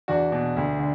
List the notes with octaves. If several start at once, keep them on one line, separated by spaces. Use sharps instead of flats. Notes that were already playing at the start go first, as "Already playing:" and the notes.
E2 D4 F#4
B2
D2
D3